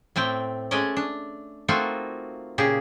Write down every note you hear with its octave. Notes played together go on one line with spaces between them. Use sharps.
A2 A3 C4 G5
G#3 A3 C#4 D5 D#5
D4
A3 A#3 C4 D#4 F4 F#4
A#2 C#3 G4 G#4